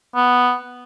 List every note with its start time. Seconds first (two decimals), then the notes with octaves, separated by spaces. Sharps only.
0.15 B3